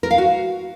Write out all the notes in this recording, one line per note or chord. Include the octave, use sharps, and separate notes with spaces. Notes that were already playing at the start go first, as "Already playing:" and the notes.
A#4
F5
F#4